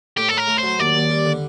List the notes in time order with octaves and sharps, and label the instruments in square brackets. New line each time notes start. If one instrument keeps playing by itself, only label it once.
[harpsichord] A2 [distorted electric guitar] G4
[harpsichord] A2 [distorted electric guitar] A4
[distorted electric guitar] A#4
[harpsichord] A3
[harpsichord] F#3 [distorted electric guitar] C5
[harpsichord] D#2 [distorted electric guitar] D5
[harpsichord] D#2
G3
D3